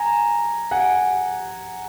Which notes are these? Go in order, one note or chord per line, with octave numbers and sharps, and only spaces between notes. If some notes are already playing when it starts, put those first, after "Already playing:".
Already playing: G#5 A#5
F#5 G#5